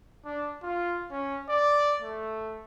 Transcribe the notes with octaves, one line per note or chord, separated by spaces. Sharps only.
D4
F4
C#4
D5
A3